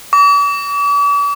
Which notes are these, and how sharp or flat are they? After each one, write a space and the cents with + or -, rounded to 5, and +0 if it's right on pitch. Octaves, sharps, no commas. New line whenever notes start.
D6 -45